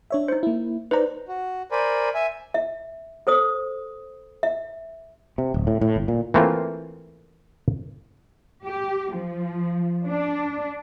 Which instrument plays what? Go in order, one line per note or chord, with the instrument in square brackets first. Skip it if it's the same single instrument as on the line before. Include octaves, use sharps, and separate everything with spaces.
[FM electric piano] D4 C#5 E5
[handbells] D#4 C5
[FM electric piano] A#3 E4
[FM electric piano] D#4 D5 [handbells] B4 C5 A#5
[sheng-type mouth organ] F#4
A#4 C5 D5 G#5 B5
E5 G#5
[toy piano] E5
A4 C5 D#6
E5
[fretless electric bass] C3
D1
A2
A2
G1
A#2
[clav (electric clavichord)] E3 A3 A#3 C4 F4
[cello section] G4
F3
D4